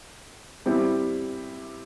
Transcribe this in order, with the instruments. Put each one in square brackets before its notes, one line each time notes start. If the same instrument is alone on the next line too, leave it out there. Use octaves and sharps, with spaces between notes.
[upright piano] G3 C4 E4 G4